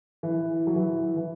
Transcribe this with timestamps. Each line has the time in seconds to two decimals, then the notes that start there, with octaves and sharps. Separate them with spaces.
0.23 E3
0.67 F#3
0.76 E3
1.17 E3